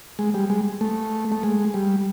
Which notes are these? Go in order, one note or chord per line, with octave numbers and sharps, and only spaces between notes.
G#3
G3
G#3
A3
A3
G#3
G3